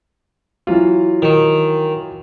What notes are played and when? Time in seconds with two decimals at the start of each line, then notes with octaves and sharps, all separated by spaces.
0.67 E3 F#3 F4
1.22 D#3